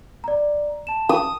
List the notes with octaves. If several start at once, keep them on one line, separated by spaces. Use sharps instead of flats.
D5 A#5
A5 E7
D#6